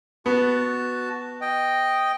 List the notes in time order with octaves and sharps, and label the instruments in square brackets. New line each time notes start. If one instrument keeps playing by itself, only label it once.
[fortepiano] B3 [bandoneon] F#4 A5
[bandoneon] D#5 G5